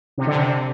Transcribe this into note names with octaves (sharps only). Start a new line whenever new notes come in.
C3
D3
C3